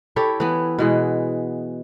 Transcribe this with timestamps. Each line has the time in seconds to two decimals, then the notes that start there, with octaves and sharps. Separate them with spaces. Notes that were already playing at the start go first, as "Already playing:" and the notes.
0.16 E4 G4 A4 C#5
0.40 E3 B3
0.79 B2 E3 G#3